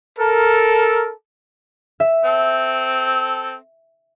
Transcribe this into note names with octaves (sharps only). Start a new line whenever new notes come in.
A4 A#4
E5
C4 A4